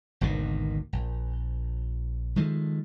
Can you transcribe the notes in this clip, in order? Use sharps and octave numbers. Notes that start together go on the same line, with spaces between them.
G#1 D2 B2 D#3
A#1
D#3 F3 G#3 A3